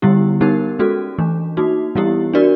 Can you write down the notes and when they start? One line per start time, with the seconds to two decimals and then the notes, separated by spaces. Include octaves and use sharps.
0.02 D3 G3 B3 E4 G4
0.41 G3 B3 D#4 G4 A#4
0.79 G#3 C#4 F#4 A4
1.18 E3 A3 D4
1.57 A#3 D#4 F#4
1.95 E3 G3 B3 E4 G4
2.33 D4 F#4 A#4 D5